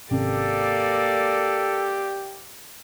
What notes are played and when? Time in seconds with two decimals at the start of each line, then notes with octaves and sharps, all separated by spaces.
0.11 G#1 C3 A#3 C#4 G4 A4 D5